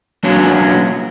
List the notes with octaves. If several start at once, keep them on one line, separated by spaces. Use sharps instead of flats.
F#3 A#3 B3 C#4 D4 F#4